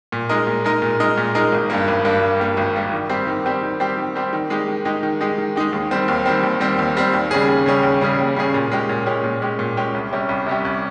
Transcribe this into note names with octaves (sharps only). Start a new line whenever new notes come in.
A#2
G#3 D#4 A#4 D#5
A#2
G#3 D#4 A#4 D#5
A#2
G#3 D#4 A#4 D#5
A#2
G#3 D#4 A#4 D#5
G#1
G2 G3 A#3
G#1
G2 G3 A#3
G#1
G2 G3 A#3
G#1
G2 G3 A#3
D#3
G3 C4 G4
D#3
G3 C4 G4
D#3
G3 C4 G4
D#3
G3 C4 G4
D#3
G#3 D#4 G4
D#3
G#3 D#4 G4
D#3
G#3 D#4 G4
D#3
G#3 D#4 G4
D#2
D#3 G3 C4
D#2
D#3 G3 C4
D#2
D#3 G3 C4
D#2
D#3 G3 C4
D#2
C#3 G3 C#4 G#4
D#2
C#3 G3 C#4 G#4
D#2
C#3 G3 C#4 G#4
D#2
C#3 G3 C#4 G#4
A#2
G#3 C#4 G4
A#2
G#3 C#4 G4
A#2
G#3 C#4 G4
A#2
G#3 C#4 G4
C2
C3 G3 C#4 G4
C2
C3 G3 C#4 G4
C2